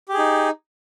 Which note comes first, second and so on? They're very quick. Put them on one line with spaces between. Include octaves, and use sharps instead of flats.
G4 G#4 D#4